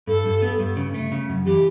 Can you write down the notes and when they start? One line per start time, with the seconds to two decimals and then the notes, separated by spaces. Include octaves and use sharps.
0.07 G2 A4
0.25 G2
0.42 B3
0.60 G2
0.77 C#3
0.94 A3
1.12 C#3
1.29 F#2
1.46 E3 G4